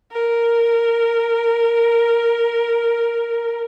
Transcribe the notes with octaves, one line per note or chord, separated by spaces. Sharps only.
A#4